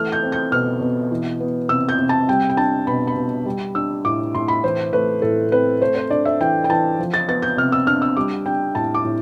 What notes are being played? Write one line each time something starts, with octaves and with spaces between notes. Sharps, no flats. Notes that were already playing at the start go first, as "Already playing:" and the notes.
Already playing: E3 A3 F6
G6
C4
G6
B2 F6
B2
E3
B3
C3 E6
G6
C3
A5
G3 G5
G5
D4 A5
B2 B5
B5
B2
G3
D4 E6
A2 D6
A2 C6
B5
E3 C5
A3 B4
A2 A4
C4 B4
A3 C5
C5
D4 D5
E5
E3 G5
G5
E3 A5
F3
A6
B3 A6
G6
C3 F6
E6
D4 F6
E6
G3 D6
D4 G5
A2 A5
D6
A2